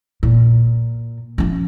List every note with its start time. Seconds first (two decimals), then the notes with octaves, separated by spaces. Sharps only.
0.23 A#2
1.38 F3 C#4